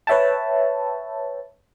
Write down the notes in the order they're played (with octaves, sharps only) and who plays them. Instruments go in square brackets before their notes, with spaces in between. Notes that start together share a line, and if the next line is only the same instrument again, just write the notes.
[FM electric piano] B4 C#5 E5 G5 A5